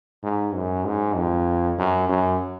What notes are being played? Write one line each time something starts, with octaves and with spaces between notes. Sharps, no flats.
G#2
F#2
G#2
F2
F#2
F#2